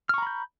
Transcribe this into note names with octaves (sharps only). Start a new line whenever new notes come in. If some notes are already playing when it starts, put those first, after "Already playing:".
A#5 B5 C#6 F6 G6